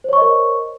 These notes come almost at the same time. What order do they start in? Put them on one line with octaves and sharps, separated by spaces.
C5 C#5 C#6 D#5 A#4